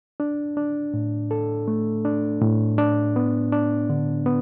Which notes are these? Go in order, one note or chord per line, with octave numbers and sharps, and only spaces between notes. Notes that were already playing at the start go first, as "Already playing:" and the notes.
D4
D4
A2
A4
A3
D4
A2
D4
B3
D4
D3
B3